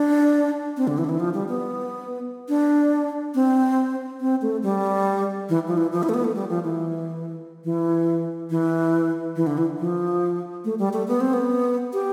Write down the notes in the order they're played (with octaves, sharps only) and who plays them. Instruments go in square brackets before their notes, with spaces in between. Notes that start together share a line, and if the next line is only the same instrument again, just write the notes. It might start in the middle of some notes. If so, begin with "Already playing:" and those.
Already playing: [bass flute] D4
C4
D3
E3
D3
E3
F3
G3
B3
D4
C4
C4
A3
G3
E3
F3
E3
F3
E4
A3
B3
A3
G3
F3
E3
E3
E3
E3
D3
E3
F3
A3
G3
A3
B3
C4
B3
G4